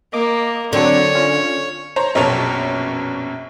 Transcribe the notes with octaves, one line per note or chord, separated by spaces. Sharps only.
A#3 D#5 D6
D3 F#3 C4 D4 C#5
C#4 F4
C5 C#5 A#5
A#1 F#2 B2 C#5 A5